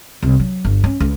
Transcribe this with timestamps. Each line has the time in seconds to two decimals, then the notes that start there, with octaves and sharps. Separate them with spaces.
0.22 C2
0.40 F#3
0.65 G1
0.84 C#4
1.00 C#2